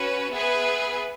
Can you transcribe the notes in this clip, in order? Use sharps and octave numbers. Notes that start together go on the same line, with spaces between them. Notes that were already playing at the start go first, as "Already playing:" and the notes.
Already playing: C#4 F#4 B4
B3 G#4 B4 E5 G#5